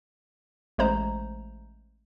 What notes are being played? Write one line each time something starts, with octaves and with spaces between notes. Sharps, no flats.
A1 G#3 A3 C5 A#5